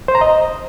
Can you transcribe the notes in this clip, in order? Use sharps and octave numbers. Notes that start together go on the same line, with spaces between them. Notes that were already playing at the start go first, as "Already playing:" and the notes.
C5
A#5
D#5